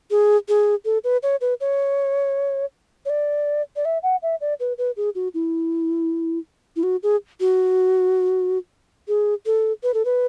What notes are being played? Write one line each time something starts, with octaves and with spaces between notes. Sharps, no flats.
G#4
G#4
A4
B4
C#5
B4
C#5
C#5
D5
D5
E5
F#5
E5
D5
B4
B4
G#4
F#4
E4
E4
F#4
G#4
F#4
G#4
A4
B4
A4
B4